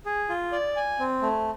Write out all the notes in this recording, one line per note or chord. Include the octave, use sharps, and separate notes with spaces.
G#4
F4
D5
G#5
C4
A3